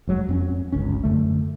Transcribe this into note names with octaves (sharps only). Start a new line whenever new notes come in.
F1 F#3 G#3
F2 C4 C#4
G1 C#2 C#4
F#2 D3 A3